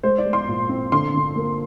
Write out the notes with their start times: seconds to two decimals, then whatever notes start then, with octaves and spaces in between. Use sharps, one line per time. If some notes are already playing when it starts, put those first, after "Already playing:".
0.03 G#3 C5
0.18 D5
0.26 G#3
0.33 C6
0.48 A#2
0.69 C4
0.92 D3 C6
1.14 D3
1.36 A#3